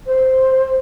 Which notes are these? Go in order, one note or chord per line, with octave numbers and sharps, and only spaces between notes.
C5